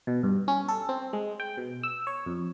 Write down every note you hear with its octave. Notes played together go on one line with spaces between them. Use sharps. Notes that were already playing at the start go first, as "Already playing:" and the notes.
B2
G2
C#4
A4
C4
G#3
G5
B2
E6
C#5
F2